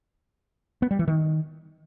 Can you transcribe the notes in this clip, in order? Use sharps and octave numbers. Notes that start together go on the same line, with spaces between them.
B3
G3
E3
D#3